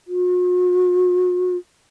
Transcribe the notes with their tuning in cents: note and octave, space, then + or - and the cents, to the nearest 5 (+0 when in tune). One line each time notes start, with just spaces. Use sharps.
F#4 -45